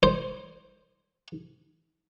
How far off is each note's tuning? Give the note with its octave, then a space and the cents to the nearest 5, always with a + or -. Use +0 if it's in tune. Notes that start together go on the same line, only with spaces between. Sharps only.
C5 +5